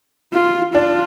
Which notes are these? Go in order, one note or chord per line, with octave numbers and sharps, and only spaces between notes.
F4
D4 F4